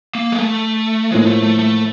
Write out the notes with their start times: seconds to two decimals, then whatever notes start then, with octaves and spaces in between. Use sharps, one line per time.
0.15 A#3
0.32 G#3
0.39 A3
1.11 A2 F3 G#3 A#3
1.26 A3
1.43 A3
1.59 A3